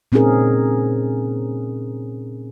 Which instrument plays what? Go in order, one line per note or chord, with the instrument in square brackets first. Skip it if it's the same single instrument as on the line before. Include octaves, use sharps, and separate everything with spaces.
[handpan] A#2 C4 C#4 D#4 G#4 A#4